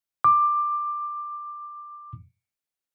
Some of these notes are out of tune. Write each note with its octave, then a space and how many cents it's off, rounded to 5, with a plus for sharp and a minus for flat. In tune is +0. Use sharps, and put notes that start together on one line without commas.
D6 +15